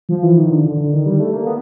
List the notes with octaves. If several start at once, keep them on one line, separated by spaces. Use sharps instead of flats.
F3
E3
D#3
D3
D3
D3
D#3
G3
A3
A#3
B3